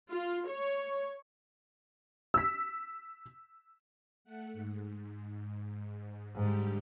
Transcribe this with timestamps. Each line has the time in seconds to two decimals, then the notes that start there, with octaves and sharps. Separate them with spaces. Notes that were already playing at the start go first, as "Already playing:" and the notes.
0.11 F4
0.49 C#5
2.34 E6 B6
4.24 A3 F#5
4.53 G#2
6.35 G#2 D3 G3 G4